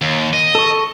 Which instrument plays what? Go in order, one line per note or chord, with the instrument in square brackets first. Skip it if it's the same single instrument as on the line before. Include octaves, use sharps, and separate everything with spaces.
[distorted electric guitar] D#2
D#5
[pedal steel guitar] A4 C#6